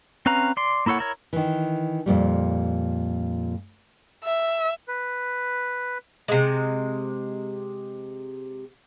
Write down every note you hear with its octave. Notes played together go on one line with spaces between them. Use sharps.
C4 C#4 B4 F5 A#5
D5 C6
A#3 E4 A4 C#5 F#5
E4 A#4 C#5
D#3 E3
F2 A#2 G3
E5
B4
C3 G#3